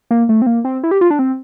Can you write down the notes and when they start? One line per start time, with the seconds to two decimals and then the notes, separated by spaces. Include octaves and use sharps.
0.11 A#3
0.29 A3
0.42 C4
0.47 A#3
0.65 C4
0.84 E4
0.91 G4
1.01 F4
1.11 D4
1.19 C4